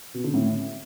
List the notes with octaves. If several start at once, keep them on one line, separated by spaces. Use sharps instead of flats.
B2
D3
A2